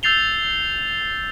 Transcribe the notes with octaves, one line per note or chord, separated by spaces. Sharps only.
E6 G6 A6 C7 F7 G7